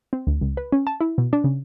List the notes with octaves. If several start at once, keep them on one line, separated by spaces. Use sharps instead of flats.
C4
D2
C#2
B4
C#4
A5
E4
B2
D4
C#3